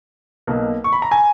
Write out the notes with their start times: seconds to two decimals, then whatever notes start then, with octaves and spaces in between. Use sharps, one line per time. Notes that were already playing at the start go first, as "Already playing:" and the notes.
0.47 B1 B2 A#3
0.84 C#6
0.93 B5
1.02 A#5
1.11 G#5